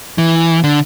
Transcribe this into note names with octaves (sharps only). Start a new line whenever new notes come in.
E3
D3